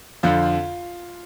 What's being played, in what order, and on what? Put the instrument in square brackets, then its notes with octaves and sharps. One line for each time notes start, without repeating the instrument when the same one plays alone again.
[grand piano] F2 D3 F3 F4